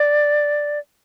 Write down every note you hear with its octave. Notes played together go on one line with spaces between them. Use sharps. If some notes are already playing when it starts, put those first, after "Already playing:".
Already playing: D5